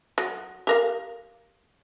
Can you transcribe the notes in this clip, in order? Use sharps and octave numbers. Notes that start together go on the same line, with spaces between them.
F#3
G4 A#4 F5